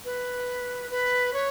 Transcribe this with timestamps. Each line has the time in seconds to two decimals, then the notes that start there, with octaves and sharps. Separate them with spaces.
0.05 B4
0.91 B4
1.33 C#5